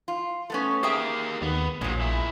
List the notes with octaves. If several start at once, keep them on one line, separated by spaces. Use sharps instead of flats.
F4
A3 B3 C#4
A#3 G4 G#4 E5 G5
D#2 B3
A#1 A#2 F3 F#3 G#3
B1 E4